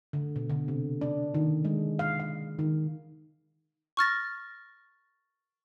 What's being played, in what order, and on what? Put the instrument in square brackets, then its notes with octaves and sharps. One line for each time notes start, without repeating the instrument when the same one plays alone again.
[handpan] D3
B2
D3
C3
D4
D#3
G#3
F5
F5
D#3
[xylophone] C#6 F6 A6 A#6